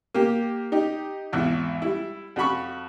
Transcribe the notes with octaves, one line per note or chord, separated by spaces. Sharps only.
A#3 G4
D#4 G4
G#1 E2 E4
G3 E4
F2 F#4 B5 C#6